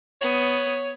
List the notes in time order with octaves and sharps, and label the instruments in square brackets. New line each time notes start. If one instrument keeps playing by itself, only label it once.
[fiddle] B3 D#6 [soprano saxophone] C#5